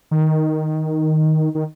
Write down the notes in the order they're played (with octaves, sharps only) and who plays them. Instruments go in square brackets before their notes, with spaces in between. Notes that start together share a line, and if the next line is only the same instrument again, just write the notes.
[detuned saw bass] D#3
D#3